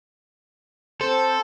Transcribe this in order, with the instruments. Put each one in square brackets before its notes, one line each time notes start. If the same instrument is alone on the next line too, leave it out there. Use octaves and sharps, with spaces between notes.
[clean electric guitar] C4 C5 [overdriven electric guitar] A4